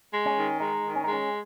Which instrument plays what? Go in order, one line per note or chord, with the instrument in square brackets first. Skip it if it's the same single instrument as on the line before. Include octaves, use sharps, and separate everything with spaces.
[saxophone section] G#3
[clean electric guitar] C#4
[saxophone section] D#3
[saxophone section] G#3 [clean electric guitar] D#4
[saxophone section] D#3
[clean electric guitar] C#4
D#4
[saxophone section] G#3
[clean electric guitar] C#4